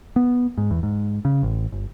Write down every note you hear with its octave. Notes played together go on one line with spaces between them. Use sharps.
B3
G#2
E2
G#2
C#3
A1
G1